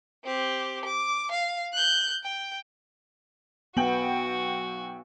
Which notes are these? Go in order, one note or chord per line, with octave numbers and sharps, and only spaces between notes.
C4 G4
D6
F5
F#6 G6
G5
B1 B3 F#4 G5 F#7